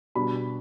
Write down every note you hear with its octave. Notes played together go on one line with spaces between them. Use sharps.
B2 G3 D4 B5